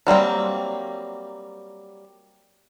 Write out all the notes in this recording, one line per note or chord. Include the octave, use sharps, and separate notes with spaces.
F#3 G3 A#3 C4